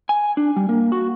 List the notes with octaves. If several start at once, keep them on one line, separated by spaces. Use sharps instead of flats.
G#5
D4
G3
A#3
F#4